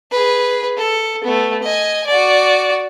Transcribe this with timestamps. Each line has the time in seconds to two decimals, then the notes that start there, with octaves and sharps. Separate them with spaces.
0.11 G#4 B4
0.77 A4
1.24 A3 B3
1.63 D#5 G#5
2.07 F#4 D5